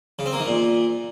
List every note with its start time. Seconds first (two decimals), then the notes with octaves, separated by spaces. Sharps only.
0.19 C#3
0.26 C4
0.33 A#3
0.40 D#3
0.47 A#2